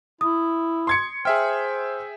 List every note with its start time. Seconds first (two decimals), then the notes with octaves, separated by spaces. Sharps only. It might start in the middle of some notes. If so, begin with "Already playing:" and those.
0.21 E4 D#6
0.87 C6 G#6 C#7
1.25 G#4 C5 E5 G5 F6